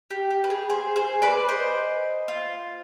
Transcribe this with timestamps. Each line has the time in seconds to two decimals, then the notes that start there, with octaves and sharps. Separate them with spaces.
0.10 G4
0.30 G4
0.44 B4
0.50 G#4
0.70 G#4 C5
0.96 G#4 C5
1.22 B4 D5
1.49 C5 D#5
2.28 F4